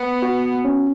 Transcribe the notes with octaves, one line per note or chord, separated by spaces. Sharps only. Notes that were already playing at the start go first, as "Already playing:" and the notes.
Already playing: B3
F#4
C#4